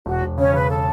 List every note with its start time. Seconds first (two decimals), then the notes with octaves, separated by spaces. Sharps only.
0.06 E1 F#4
0.22 E1
0.38 C#3 C#4 C#5
0.54 C#3 B4
0.69 A4